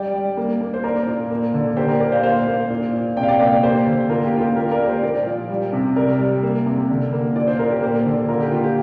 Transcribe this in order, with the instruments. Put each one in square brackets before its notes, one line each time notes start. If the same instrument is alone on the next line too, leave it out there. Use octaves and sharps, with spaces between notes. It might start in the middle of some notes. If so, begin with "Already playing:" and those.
Already playing: [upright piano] G3 D5 G5
G3
A#3
A#3
C5
A#3 A#4 D5
A#2
A#3
D3
A#3 G4 C5
A#4 D5
A#2 A#4 D5
C5 F5
A#3 C5 F5
A#3
A#2
A#2
C3 D5 G5
F5
D5 G5
A#3 D5 G5
A#3 G4 C5
D3
A#3 F4 A#4
G4
A#3 F4
G4
A#3 F4 A#4
A#4 D5
A#3
G4 C5
A#2 A#4 D5
F3
G3
C3
C3 A#4 D5
G3
A#3
C3
D3
A#3
A#2 D5
C5
A#2 A#4
G4 C5
A#3
D3
D3 F4 A#4
G4
A#3 F4
G4